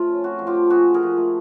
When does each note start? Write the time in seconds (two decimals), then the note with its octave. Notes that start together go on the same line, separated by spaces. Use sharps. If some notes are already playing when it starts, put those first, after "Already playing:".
Already playing: F3 A3 F4
0.08 C#4
0.24 C4 F#4
0.39 F3
0.47 F4 G4
0.55 A3
0.70 F3 F#4 G#4
0.87 C4
0.94 G#4 A#4
1.03 F3
1.17 A3